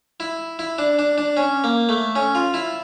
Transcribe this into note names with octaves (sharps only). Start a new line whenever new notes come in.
E4
E4
D4
D4
D4
C#4
A#3
A3
C#4
F4
E4